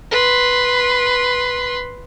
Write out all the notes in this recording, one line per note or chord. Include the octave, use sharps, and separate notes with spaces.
B4 C6